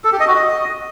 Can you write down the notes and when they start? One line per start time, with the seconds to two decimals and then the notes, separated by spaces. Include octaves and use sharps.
0.04 A4
0.12 G4
0.20 D#5
0.28 F#4
0.36 D#5